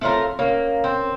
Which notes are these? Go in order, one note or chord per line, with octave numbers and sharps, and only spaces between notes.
A3 C4 F4 A#4 C#5
A#3 C#4 A#4 C#5
C4